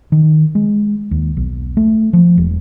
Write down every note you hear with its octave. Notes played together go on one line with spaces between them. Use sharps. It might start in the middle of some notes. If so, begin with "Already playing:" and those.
D#3
G#3
D#2
B1
A3
F3
E1